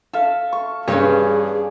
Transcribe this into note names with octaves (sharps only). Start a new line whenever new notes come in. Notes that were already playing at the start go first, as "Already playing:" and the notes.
A4 E5 F5
C#6
G2 C#4 G#4 B4 C#5 D5